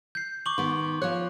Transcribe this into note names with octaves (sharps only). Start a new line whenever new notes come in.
G6 C7
C#6 D6 F#7
D#3 B3 C6
F3 C#5 F#6